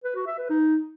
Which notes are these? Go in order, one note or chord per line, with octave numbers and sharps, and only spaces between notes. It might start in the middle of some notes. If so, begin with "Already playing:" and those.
B4
F#4
E5
B4
D#4